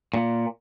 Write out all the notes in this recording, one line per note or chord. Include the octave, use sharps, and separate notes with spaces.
A#2